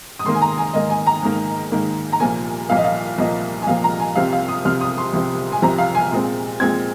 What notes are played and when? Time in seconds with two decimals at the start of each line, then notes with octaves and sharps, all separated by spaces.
0.19 D#6
0.24 G#2 D#3 A#3 C6
0.35 G#5
0.42 A#5
0.58 G#5
0.73 G#2 D#3 A#3 D#5
0.90 G#5
1.07 A#5
1.22 G#2 D#3 A#3
1.72 G#2 D#3 A#3
2.12 A#5
2.20 C2 A#2 F3 A#3 G#5
2.69 C2 A#2 F3 A#3 F5
2.77 D#5
2.84 F5
3.18 C2 A#2 F3 A#3 D#5
3.62 G#5
3.67 C2 A#2 F3 A#3 F5
3.84 A#5
4.00 G#5
4.16 C2 C3 F3 C4 F5
4.33 F5
4.48 D#6
4.65 C2 C3 F3 C4 F6
4.81 D#6
4.98 C6
5.13 C2 C3 F3 C4
5.52 G#5
5.62 C2 C3 F3 C4 A#5
5.78 F5
5.95 G#5
6.12 A#2 G#3 C4
6.60 A#2 G#3 C4 G#6